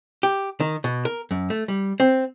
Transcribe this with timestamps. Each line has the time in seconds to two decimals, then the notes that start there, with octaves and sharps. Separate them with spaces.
0.23 G4
0.60 D#3
0.84 B2
1.05 A#4
1.31 F#2
1.50 A3
1.68 G3
2.00 C4